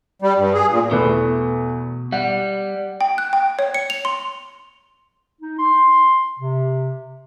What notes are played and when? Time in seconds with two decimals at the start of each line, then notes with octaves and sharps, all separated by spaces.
0.22 G3
0.38 G2
0.54 G#4
0.70 A#2
0.91 E2 B2 A3 B4
2.12 G3 F#5
3.01 G5
3.18 F#6
3.33 G5
3.59 C#5
3.74 C#7
3.90 F7
4.05 C6
5.42 D#4
5.59 C6
6.39 C3